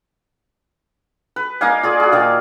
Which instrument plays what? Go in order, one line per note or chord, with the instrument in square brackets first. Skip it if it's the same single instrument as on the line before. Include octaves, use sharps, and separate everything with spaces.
[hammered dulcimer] B4
A#3 D#4 F5 G#5
F4 G#4 D5
F#4 G#4
A#2 D#3 F5